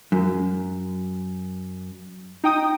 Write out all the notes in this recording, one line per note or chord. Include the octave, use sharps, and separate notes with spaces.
F#2
D#4 G5 D#6